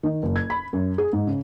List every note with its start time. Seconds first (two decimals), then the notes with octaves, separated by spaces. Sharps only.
0.03 D#3
0.23 F#1
0.36 G#6
0.50 B5
0.73 F#2
0.98 G#4
1.13 G#2
1.27 C#3